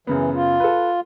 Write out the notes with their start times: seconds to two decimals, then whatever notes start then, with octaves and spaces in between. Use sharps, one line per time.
0.07 F#2 C#3 E3 B3
0.33 F4
0.60 A4 B4